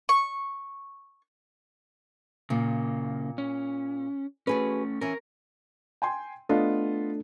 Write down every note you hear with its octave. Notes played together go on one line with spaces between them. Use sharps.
C#6
A#2 C#3 A#3
C#4
A3 C#4 F#4 G#4 B4
E3 C#4 A#4
G5 G#5 C6
A3 B3 D4 F4 A4 D#5